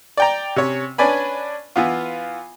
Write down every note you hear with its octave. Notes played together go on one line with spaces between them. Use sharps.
D5 G5 A#5
C3 C#4 C#5
C#4 D4 B4 D5 G#5 B5
E3 B3 F4